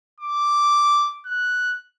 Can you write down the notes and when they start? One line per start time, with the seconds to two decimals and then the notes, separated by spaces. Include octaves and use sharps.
0.20 D6
1.26 F#6